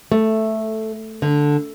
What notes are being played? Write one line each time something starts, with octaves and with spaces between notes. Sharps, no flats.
A3
D3